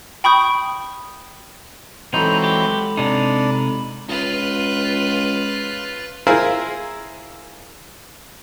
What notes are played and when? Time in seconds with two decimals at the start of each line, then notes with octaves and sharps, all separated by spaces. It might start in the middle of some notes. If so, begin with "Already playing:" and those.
0.24 G5 B5 C#6 D#6 G6
2.14 E3 F#3 G#3 C4 D#4 A4 B5 G6
2.44 G4 B5
2.97 C3 D4 D#4
4.08 C#2 F4 B4
6.27 E4 F4 G#4 A#4 C5